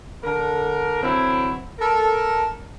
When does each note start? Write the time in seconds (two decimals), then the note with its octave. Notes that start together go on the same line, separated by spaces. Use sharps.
0.24 D3 A#4
1.03 D3 E3 F#3 C4 E4
1.79 A4 A#4